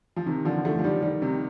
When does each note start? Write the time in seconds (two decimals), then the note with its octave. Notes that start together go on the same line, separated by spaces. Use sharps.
0.16 F3
0.26 C3 D#3
0.45 D3 F3
0.65 F3 A3
0.79 F3
0.84 D#3 G3
1.02 D#3 G3
1.22 C3 D#3